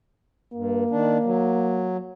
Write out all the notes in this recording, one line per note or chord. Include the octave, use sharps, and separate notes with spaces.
G2 A#3
D#3 D4
F#3